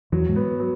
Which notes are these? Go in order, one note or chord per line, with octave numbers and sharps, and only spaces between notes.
E2 E3 F#3
G#2 G#3
B3
F#3